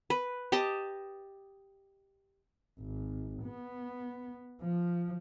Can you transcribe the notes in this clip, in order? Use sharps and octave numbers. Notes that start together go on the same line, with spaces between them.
B4
G4 D#5 A5
G#1
B3
F3